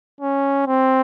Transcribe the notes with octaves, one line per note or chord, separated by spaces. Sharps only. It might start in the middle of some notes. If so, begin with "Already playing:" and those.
C#4
C4